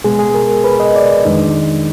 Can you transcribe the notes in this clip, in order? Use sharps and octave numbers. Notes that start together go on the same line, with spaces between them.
B2 G#3 B3 G#4
G#4
A#4
B4
D#5
D5
F2 D#3 G#3 D4 D#4